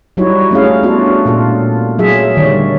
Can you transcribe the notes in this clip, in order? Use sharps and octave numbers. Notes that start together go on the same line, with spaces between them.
F#3 G3 D#4 E4 F#4 C#5
A3 C#4 E4 G#4 F5
B3 D4 F4 F#4 A4
A#2 D4 F4 A4
F#3 F4 G#4 E5
D3 D#3 G3 C#5 D5